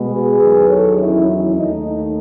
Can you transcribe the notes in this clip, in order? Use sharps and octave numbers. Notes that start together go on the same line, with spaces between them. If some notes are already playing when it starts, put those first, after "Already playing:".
Already playing: B2 G#3 B3
G#4 B4
E2 D#3 F#3
A4 C#5
C#4 E4
C#4 E4
D#2 D#3 A3 D#4
D#4